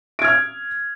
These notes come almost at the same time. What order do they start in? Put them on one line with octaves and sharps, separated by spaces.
D7 G#6 F6